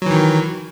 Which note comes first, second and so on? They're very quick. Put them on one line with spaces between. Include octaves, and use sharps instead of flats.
F#3 E3 D#3